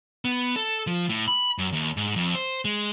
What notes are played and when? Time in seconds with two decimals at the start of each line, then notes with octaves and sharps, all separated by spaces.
0.25 B3
0.56 A4
0.87 F3
1.09 A2
1.28 B5
1.58 F#2
1.72 D#2
1.97 G#2
2.16 F2
2.35 C5
2.65 G#3